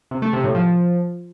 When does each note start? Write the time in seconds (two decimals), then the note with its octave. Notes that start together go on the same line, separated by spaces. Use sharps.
0.11 C3
0.22 A3
0.33 C3
0.44 A2
0.55 F3